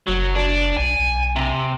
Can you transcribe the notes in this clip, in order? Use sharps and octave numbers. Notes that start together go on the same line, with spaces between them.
F#1 F#3
D4
B1 G#5
B1
C3